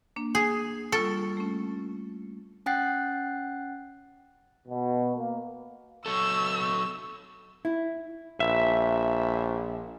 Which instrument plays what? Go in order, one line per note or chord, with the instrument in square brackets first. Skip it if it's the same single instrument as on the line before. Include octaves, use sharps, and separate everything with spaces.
[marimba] A#3 D4
[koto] G#4
[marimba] G3 F4 C#6 [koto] A4
[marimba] A3 C#4
[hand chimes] C#4 F#5 G5 F#6 A6 C7
[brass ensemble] B2
A#3
[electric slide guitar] F#3 A4 [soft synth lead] C#6 [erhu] E6
[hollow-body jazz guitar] E4
[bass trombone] A#1 [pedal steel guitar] E5